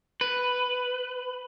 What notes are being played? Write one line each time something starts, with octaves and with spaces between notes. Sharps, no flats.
B4